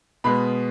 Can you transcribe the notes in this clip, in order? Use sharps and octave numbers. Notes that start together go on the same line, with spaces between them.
B2 G#3 B3 B5